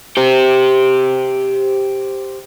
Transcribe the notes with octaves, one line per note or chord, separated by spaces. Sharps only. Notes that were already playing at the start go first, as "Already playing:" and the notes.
G4 C5